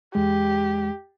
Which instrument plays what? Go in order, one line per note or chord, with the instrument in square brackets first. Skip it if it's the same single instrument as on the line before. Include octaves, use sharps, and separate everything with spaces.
[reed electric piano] E2 G#3 [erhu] G4